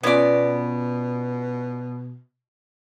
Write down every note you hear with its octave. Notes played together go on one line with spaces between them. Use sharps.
B2 B3 C#4 F4 C#5 D5